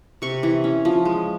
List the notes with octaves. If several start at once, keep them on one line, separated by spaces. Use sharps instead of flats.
C3 C#6
E3
C#4
F3
G#3